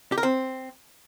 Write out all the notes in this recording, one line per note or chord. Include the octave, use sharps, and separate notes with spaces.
G4
A#4
C4